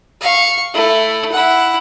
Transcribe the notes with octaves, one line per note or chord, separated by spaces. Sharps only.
F5 C#6
A3 E4
E4 F#5